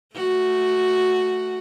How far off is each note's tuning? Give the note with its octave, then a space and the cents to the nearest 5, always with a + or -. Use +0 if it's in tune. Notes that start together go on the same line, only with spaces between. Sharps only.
A3 +0 F#4 +0